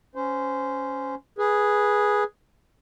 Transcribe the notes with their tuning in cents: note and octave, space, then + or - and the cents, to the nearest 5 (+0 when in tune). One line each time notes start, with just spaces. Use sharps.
C#4 +0 C5 -15
G#4 +0 B4 -15